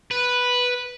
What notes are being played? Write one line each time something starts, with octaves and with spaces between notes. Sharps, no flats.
B4